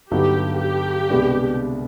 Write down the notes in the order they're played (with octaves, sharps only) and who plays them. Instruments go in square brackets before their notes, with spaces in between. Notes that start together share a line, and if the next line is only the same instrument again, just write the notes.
[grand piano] G2 D3 F#3 B3 D#4 [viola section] G4
[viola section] G4
[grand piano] C2 B2 G#3 B3 D4